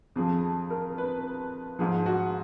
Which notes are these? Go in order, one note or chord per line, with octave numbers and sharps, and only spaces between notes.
F2 F3 G#4
A#4
B4
G#2 F3 G#4
F#4